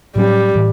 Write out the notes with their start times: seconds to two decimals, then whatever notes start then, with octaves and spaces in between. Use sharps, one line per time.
0.16 A2 F#3 G3 C#4
0.55 A2 E3